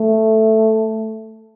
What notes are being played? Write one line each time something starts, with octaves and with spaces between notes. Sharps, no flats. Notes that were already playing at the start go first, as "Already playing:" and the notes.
Already playing: A3